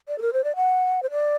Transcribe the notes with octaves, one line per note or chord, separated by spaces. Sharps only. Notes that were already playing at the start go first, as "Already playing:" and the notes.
D5
A4
A#4
C5
D5
F#5
C5
D5